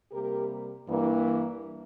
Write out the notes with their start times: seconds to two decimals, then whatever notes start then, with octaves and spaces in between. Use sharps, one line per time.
0.12 C3 G3 A#3 G4 A#4
0.87 G2 E3 A#3